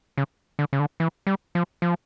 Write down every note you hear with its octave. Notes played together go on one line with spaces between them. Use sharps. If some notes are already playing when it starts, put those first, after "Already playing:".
C#3
D3
C#3
D3
E3
G3
F3
F3